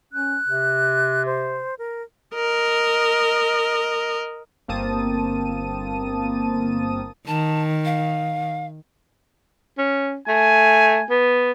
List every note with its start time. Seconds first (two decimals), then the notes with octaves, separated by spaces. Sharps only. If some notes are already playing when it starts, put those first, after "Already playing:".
0.13 C#4 F#6
0.48 C3
1.26 C5
1.79 A#4
2.35 A#4 D#5
4.68 G1 A#3 C4 A5 D#6 D#7
7.27 D#3 A5
7.85 F5
9.78 C#4
10.28 A3 G#5
11.10 B3